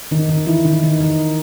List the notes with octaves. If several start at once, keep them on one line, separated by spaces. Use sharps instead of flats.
D#3 D#4
D#3 D#4
E3 E4
D#3 D#4
D#3 D#4
D#3 D#4